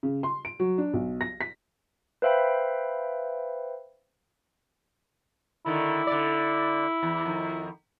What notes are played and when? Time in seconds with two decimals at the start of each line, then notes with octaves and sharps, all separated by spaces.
0.03 C#3
0.23 C6
0.45 D7
0.60 F#3
0.78 D4
0.93 B1
1.21 A#6
1.41 B6
2.22 B4 C5 E5 F5 G5 B5
5.66 D3 D#3 E4
6.07 D3 D5
7.03 E2
7.25 F2 D#3